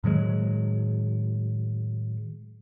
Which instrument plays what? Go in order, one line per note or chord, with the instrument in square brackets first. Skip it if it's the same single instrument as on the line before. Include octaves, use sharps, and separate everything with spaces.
[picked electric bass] A2 D#3 F#3 G#3